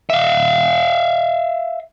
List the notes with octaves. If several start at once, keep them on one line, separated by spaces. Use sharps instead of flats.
E5 F5